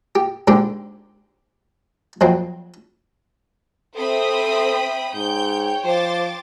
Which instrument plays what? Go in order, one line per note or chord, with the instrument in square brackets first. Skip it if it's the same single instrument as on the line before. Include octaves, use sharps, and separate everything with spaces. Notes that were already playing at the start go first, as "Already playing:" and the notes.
[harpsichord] G4
G#2 D3 G4
F2 F#3 C4
[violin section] C4 C5 B5 [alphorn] A4 [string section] E5 G5 D#6
[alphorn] G#2 [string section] C#5 G5 [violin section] G6
[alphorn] F3 [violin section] C5 D6 A6